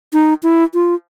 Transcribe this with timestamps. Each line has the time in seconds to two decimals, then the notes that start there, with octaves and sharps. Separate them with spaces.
0.13 D#4
0.43 E4
0.74 F4